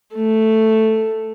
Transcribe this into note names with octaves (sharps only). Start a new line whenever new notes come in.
A3